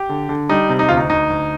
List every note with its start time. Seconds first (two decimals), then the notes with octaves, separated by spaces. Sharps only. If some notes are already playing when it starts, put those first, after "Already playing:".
Already playing: G4
0.09 D3
0.29 D3
0.49 G3 D#4
0.69 C3
0.79 D#4
0.89 D2 F4
0.97 D#4
1.10 D2 D#4
1.30 D2